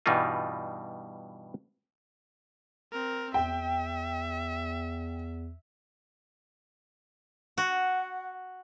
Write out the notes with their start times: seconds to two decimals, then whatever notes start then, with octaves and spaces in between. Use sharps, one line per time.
0.06 G2 B2 E3 G3 D#4 F4
2.92 C4 A#4
3.34 E2 E5 G5
7.58 F#4 F#5